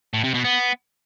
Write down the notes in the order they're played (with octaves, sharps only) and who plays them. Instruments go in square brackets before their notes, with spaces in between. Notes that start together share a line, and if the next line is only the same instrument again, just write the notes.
[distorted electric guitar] A2
C3
B2
B3